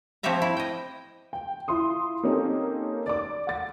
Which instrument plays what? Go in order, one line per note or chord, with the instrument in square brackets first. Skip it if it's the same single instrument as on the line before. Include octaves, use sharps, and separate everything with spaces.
[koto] F3 C4 G4 C#5 E5 A#5
E4
D#5 G5
[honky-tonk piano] G5
E4 F4 C6 D#6
A#3 C4 C#4 D#4 G4 A4
D5 D6
F#5 A6